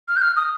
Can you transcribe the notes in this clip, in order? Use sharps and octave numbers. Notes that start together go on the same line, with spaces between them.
F6
G6
F6
D#6